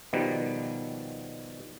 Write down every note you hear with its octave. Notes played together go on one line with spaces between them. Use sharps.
B2 D#3 F3 G3